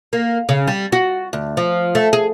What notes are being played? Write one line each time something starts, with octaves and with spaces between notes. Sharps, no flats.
A#3
C#3
G3
F#4
D2
F3
A3
G#4